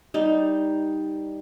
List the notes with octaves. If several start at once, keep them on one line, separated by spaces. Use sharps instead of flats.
G3 D#4